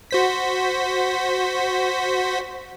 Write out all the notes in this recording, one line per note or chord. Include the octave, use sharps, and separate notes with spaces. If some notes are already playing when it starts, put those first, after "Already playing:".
F#4 C5 B6